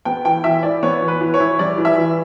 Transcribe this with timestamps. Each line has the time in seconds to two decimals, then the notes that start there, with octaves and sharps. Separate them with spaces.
0.05 B3 G5
0.25 E3 G5
0.44 E3 E5
0.63 E4 D5
0.83 B3 C#5
1.02 E3
1.08 B4
1.21 E3
1.34 C#5
1.40 E4
1.59 G3 D5
1.78 E3
1.85 E5
1.98 E3